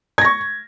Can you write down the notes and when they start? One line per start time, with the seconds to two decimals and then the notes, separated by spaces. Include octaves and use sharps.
0.18 G#6
0.21 A#6
0.25 C#6